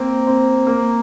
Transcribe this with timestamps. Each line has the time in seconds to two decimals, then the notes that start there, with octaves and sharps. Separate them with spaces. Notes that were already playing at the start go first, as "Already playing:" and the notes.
Already playing: A#3 C4
0.27 C4
0.67 A#3